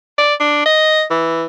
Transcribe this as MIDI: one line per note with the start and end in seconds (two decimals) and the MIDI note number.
0.18 0.34 74
0.40 0.61 62
0.66 1.03 75
1.10 1.46 52